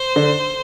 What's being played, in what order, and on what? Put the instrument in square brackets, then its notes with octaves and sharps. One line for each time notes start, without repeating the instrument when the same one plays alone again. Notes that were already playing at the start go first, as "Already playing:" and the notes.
Already playing: [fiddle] C5
[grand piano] D3